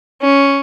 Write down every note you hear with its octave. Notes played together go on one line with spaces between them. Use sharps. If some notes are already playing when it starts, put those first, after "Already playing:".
C#4